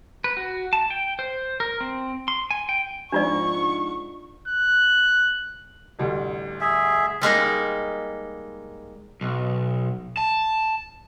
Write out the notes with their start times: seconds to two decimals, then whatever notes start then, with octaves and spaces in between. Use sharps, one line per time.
0.24 B4
0.37 F#4
0.73 A5
0.90 G5
1.19 C5
1.60 A#4
1.81 C4
2.28 C6
2.51 G#5
2.69 G5
3.12 G#2 F3 C4 D4 F4 D5 C#6
4.48 F#6
5.99 A1 D2 G3
6.61 G#4 E5
7.21 G3 G#3 A#3 D#4
9.21 B1
10.17 A5